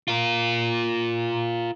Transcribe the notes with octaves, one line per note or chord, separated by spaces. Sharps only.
F4 A#4